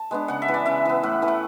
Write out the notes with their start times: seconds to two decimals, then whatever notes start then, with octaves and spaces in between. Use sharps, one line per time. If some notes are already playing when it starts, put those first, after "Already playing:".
Already playing: A5
0.11 G#3 B3 D4
0.28 C#3 F#5
0.42 E5
0.48 E3 B3
0.54 D5
0.66 C#3 E5
0.85 E3 B3
1.03 A2 F#5
1.22 E3 A3
1.28 F#5